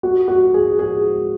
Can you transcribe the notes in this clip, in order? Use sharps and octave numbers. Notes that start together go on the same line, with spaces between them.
F#4
F#4
G#4
G#4